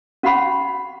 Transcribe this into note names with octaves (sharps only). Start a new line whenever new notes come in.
C#4 F#4 F5 F#5 B5 C#6